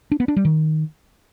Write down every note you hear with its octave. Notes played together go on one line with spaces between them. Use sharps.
D4
B3
D4
G3
D#3